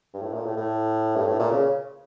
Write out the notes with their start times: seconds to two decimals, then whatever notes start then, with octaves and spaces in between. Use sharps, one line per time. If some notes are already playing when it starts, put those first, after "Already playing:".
0.14 G2
0.22 A2
0.34 A#2
0.46 A2
0.57 A2
1.16 G2
1.28 A2
1.39 A#2
1.51 C#3